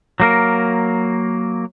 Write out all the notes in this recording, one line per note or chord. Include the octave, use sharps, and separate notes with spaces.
F#3 A#3 A#4